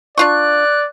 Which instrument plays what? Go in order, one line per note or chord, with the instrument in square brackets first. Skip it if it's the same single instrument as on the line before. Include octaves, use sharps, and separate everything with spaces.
[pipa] D4 F4 C#6 [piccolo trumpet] D5 [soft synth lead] F#6